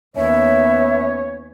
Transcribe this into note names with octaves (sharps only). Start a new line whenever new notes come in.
D#2 B3 C#4 C#5 E5